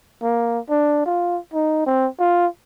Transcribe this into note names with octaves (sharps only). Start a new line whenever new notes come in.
A#3
D4
F4
D#4
C4
F4